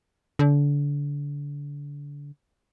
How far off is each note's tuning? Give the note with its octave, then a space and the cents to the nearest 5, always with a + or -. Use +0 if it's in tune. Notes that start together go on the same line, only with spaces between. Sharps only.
D3 -30